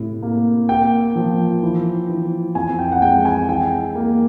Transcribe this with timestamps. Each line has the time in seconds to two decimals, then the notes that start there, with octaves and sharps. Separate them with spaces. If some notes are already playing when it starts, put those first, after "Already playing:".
Already playing: A2 C3
0.22 A#3
0.69 A#3 G5
1.15 F3
1.62 E3
2.09 E3
2.55 F2 G#5
2.79 G5
2.92 F#5
3.02 G#3 G5
3.25 G#5
3.49 E3 G5
3.95 A#3